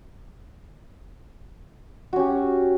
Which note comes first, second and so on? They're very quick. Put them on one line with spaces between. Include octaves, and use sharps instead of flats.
F#4 C#4 G4